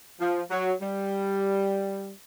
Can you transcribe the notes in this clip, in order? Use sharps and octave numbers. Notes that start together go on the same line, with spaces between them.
F3
F#3
G3